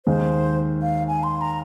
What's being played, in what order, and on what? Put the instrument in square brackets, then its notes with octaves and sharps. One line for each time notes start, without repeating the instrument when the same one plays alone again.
[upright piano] D#2 D#3 G#3 [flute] C5
[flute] F5
G#5
C6
A#5